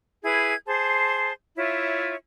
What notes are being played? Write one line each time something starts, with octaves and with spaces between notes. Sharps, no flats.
E4 G#4 B4 G#6
G#4 C5 A5 C6
E4 F4 C#5 E5